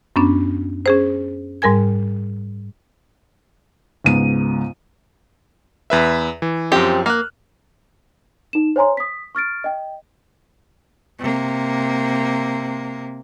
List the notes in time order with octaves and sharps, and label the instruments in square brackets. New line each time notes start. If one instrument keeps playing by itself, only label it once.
[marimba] F#2 B3 C#4 D4
C#4 G#4 C5
G#2 G3 A#4 G#5 G#6
[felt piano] C#2 G#2 B3 D#7
[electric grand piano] E2 B4 E5
E3
[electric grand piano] F#2 F3 [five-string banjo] C4 G4
[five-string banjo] A#3 [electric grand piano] F6 F#6
[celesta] D#4 E7
C5 C#5 G#5 A#5 C6
D#6 B6
C#6 F6 A6 D7
D#5 G5
[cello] C3 A#3